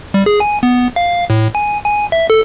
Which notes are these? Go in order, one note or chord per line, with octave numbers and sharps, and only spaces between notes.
G3
G#4
G#5
B3
F5
A2
G#5
G#5
E5
A4